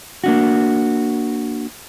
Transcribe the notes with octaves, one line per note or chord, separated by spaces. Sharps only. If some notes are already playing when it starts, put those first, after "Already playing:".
A#3 D4 F#4